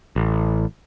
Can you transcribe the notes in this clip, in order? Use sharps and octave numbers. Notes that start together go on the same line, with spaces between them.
A1